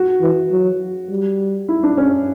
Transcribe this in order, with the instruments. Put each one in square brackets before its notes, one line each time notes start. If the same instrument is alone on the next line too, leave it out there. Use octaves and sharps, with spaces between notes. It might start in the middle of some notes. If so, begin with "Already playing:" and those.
Already playing: [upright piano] F#4
[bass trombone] E3
F#3
G3
[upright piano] E4
D4
C#4